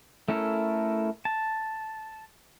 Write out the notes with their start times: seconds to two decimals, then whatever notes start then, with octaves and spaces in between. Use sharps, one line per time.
0.28 A3 C#4 E4 A4 A#4
1.25 A5